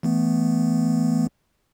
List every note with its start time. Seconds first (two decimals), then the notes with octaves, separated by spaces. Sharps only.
0.03 E3 A3 B3